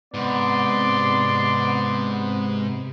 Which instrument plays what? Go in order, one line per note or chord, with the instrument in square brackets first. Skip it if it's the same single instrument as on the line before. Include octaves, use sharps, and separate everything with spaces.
[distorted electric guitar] G#2 [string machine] C3 [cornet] B3 [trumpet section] D5 C6